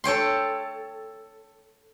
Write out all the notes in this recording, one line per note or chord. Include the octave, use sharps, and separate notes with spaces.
A4 C#5 G5 C6